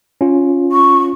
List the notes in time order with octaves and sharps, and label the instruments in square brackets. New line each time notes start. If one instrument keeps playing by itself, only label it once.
[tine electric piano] C#4 F4
[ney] C#6